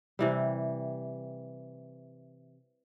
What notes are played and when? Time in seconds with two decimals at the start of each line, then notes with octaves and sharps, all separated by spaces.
0.19 C3 E3 G3